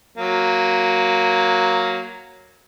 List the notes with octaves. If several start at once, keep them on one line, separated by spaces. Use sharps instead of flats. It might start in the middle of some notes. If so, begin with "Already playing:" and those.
F#3 A#3